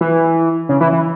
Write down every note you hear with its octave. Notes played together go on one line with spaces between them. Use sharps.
E3
C#3
E3
E3